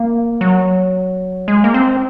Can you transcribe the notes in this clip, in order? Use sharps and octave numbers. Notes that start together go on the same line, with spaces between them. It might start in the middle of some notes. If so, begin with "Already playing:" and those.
Already playing: A#3
F#3
G#3
A#3
C4